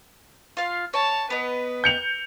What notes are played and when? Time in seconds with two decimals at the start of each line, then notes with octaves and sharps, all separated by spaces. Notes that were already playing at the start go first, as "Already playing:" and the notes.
0.57 F4 F5
0.94 C#5 A5
1.30 B3 B4 D#5
1.84 G6 C#7 F7